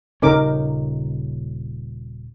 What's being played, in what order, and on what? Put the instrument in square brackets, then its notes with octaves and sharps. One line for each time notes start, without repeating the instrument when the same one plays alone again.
[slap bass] D#1 C#3 C#4 [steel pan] D#4 A#4 D6